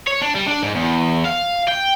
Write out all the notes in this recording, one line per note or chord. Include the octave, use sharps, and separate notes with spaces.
C#5
D4
G3
D4
G#2
E2
F5
G5